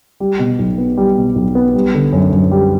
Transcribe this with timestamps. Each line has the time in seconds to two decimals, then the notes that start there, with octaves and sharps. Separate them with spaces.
0.20 G3
0.39 B2
0.59 B1
0.78 B3
0.97 G3
1.17 B2
1.36 B1
1.55 B3
1.75 G3
1.94 D3
2.13 F#2
2.32 F#2
2.51 G3